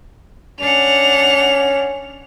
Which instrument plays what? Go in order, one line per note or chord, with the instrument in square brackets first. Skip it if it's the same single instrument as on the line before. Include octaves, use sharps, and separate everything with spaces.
[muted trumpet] C#4 [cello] D4 F#5 [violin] F7